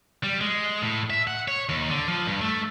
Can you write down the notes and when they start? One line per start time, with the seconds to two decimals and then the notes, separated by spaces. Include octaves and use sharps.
0.23 G3
0.41 G#3
0.82 A2
1.10 E5
1.27 F#5
1.48 C#5
1.69 D#2
1.90 D3
2.08 F3
2.27 G2
2.42 A3